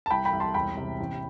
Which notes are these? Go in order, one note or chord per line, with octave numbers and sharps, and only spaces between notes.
A5
C2 G5 B5
G5 B5
C2
A5 C6
E1 G5 B5
C3
A1